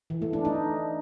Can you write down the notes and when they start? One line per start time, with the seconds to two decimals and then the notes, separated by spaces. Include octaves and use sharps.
0.10 E3
0.22 A3
0.33 D4
0.45 D#4